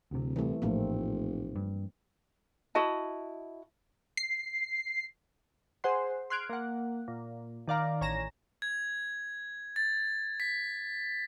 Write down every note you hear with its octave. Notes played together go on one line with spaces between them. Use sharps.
D1 D2 C3
C2 E3 A3
F1 A#1 A2 F3 A#3 C4
G2
E4 F#4 D#5 A5
C7
G#4 C5 F#5 C6
C6 F6 F#6 G#6 D7
A#3 F#5
A#2
D#3 D5 F5 A#5
A1 C#5 G#5 A#5 A#6 E7
G#6
A6
B6